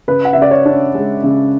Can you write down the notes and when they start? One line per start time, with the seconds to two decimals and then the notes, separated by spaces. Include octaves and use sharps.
0.08 C#3 B4
0.25 F#5
0.33 C#3 E5
0.42 D5
0.51 C#5
0.66 D4
0.95 G#3
1.24 C#3